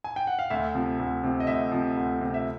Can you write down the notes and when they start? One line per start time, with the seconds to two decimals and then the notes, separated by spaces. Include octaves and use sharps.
0.04 G#5
0.16 G5
0.27 F#5
0.39 F5
0.50 D2 E5
0.75 C3 F3
0.99 D2
1.23 C3 F3
1.40 D#5
1.47 D2 E5
1.72 C3 F3
1.97 D2
2.21 C3 F3
2.34 E5